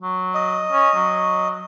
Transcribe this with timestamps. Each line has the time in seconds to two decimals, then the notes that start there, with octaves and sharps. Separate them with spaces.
0.01 F#3
0.34 D#5
0.72 C#4
0.95 F#3